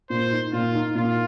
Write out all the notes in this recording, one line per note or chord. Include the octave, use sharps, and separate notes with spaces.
A#2 C5
D#4
A#2 F4
D#4
A#2 F4